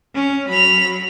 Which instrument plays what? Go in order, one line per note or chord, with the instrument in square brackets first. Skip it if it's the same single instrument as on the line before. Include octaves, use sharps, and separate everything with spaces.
[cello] C#4
[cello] F#3 [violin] B5 F7